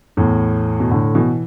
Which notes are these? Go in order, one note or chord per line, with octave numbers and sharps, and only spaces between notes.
E2 A2
B2
A2 D3
B2 E3